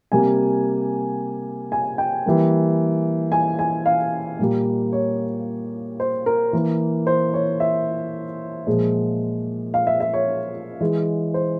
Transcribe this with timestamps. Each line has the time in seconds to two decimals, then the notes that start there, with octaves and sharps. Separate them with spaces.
0.12 C3 G3 A#3 G#5
1.72 G#5
1.98 G5
2.26 E3 G3 A#3
3.32 G#5
3.59 G#5
3.86 F5
4.39 A#2 G3 A#3
4.92 C#5
6.00 C5
6.26 A#4
6.53 E3 A#3
7.07 C5
7.34 C#5
7.60 E5
8.67 A#2 F3 G#3
9.74 F5
9.87 E5
10.00 E5
10.13 C#5
10.80 E3 G#3
11.34 C5